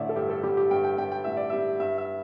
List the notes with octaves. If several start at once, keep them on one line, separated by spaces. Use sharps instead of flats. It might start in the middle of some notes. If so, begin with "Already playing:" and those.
Already playing: A1 D3 D5 E5
A4
G2 G4
A4
G3 G4
G4
G2 G5
G5
G2 G5
G5
A1 E5
D5
G3 E5
G2 E5
E5